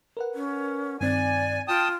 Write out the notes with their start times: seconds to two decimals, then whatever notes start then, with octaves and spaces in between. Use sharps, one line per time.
0.17 A#4 B4 F#5
0.35 C#4
1.01 G2 D#3 C4 D5 G#5
1.68 F4 G5 A5 D#6